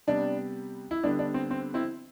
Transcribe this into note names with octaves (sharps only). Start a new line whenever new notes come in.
C3 G3 B3 D4
E4
D3 G3 B3 D4
D4
C4
C4
C4 E4